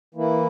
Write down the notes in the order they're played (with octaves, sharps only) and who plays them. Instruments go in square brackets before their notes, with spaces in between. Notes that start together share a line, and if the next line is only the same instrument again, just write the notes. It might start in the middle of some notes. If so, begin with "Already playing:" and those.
[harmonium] E3 A#3 E4